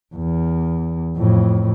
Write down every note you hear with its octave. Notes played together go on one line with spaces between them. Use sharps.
E2
F2 A2